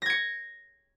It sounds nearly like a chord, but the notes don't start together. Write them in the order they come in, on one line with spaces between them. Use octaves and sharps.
A#6 G#6 C#7